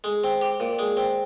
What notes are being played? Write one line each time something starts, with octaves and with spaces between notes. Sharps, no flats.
G#3
C4
G4
A#2
G#3
C4